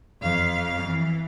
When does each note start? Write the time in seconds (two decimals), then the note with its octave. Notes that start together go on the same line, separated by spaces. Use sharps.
0.21 F2 F5
0.83 E3